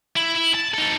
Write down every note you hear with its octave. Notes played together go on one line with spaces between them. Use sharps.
E4
E4
A5
D#4 A4